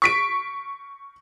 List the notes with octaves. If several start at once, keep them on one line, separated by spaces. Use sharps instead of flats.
C#6 B6 D7